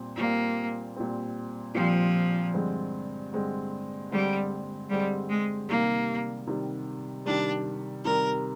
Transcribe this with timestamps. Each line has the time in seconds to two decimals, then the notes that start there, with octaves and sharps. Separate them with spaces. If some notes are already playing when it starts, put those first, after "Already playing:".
Already playing: A#2 G3 C4
0.17 A#2 G3 A#3 C4
0.96 A#2 G3 C4
1.75 A#2 F3 G3 C4
2.54 G2 D3 G#3 C4
3.33 G2 D3 G#3 C4
4.11 G2 D3 G3 G#3 C4
4.89 G2 D3 G3 G#3 C4
5.29 G#3
5.68 C3 D#3 G3 A#3
6.47 C3 D#3 G3
7.26 C3 D#3 G3 D4
8.05 C3 D#3 G3 A#4